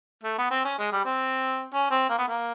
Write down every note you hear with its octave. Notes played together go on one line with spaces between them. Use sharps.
A3
B3
C4
C#4
G#3
G3
C4
C#4
C4
A#3
B3
A#3